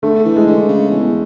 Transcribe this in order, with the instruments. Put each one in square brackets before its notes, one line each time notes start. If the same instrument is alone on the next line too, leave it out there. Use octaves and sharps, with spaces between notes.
[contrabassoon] D3 [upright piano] A3
[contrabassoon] E3
[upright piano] G#3
[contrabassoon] D3
C#3
E2